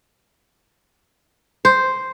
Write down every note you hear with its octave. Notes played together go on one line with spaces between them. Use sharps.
C5